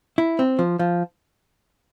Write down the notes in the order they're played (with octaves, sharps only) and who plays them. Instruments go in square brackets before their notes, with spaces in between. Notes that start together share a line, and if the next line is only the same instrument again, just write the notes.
[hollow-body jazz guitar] E4
C4
F3
F3